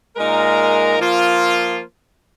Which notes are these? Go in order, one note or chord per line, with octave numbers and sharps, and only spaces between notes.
A#2 G#3 D#4 A#4
F3 A#3 F4